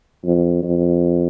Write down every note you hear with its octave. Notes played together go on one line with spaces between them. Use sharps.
F2
F2